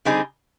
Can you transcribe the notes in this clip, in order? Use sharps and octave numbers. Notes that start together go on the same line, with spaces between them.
D3 G3 C4 D#4 G#4